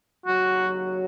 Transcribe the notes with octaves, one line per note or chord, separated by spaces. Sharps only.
D#2 C#3 F#3 F#4